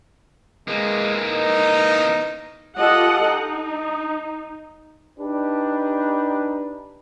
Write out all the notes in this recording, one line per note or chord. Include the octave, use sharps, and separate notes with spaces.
E3 G#3 A#3
D#4
F4 G4 A4 D#5 F#5
D#4
D4 D#4 G4 B4